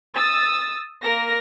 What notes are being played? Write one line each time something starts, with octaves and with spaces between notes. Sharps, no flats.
D#6 E6 A6
A#3 A#4 A#6